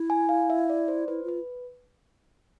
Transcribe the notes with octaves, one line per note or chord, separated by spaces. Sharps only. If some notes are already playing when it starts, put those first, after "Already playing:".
Already playing: E4
G#5
F5
E5
D5
C5
E4 B4
F4 B4